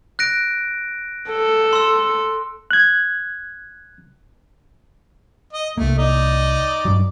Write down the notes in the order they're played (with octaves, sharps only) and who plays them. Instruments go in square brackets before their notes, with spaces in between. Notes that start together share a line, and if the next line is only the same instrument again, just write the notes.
[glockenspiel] F#6 A#6 D7
[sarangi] A4
[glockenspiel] C6 E6
[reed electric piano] F#6 G#6
[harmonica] D#5
[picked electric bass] C2 A#3 [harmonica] A3
[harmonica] D#4 D5 D#5
[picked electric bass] G2 F#3